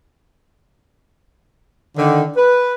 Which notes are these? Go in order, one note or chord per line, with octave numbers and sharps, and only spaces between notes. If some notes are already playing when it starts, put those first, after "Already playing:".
D3 D#3
B4